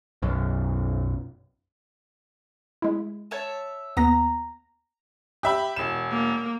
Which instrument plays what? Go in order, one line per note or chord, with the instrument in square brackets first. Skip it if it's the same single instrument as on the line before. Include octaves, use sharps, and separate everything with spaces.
[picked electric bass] B1 F#2
[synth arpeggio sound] G#3 E4
[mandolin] C#5 E5 A5
[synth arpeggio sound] D#2 B3 A#6 [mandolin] A#5
[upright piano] G4 E5 B5
E1 E7
[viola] A#3